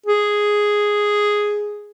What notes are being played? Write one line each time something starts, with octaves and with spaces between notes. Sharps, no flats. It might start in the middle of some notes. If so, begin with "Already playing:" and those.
G#4